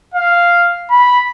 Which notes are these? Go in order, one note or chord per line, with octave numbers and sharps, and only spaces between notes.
F5
B5